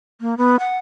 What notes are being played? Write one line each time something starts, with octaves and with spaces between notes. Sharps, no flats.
A#3
B3
F#5